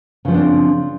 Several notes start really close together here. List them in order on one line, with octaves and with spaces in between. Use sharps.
C#3 F3 B3 D4 C4